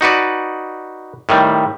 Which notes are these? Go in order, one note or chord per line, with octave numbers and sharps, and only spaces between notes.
D#4 F#4 B4 D5
A2 D#3 G3